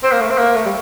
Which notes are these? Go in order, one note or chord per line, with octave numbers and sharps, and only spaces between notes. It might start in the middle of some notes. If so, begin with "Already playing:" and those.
C4
A#3
A3
C4
A#3
A3
G3